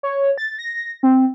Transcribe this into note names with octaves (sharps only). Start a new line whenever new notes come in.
C#5
A6
A#6
C4